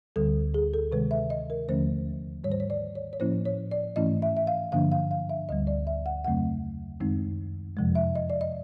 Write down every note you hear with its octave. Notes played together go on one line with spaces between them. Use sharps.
D2 D3 G3 A4
G#4
A4
C3 D#3 G#3 B4
E5
D#5
A#4
D#2 D3 F3 A3 C#4 C5
G#2 D#3 G3 C#5
C5
C#5
D5
C#5
C#5
A2 F3 A#3 C#4 E4 C5
C#5
D5
G#2 E3 A3 C#4 E4 D#5
E5
E5
F5
G2 D3 F3 A#3 D4 F5
F5
F5
E5
D2 D3 G3 D#5
D5
E5
F#5
F2 C#3 F#3 A3 C4 F#5
F#2 D#3 G#3 C4 D#4
F2 C3 F3 G#3
E5
D#5
D5
D#5